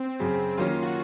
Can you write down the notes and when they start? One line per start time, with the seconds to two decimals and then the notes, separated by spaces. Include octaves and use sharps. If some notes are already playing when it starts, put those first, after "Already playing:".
Already playing: C4
0.20 F#2 C#3 F#3
0.58 D#3 F#3 A#3 C#4 F4
0.71 F4
0.83 F#4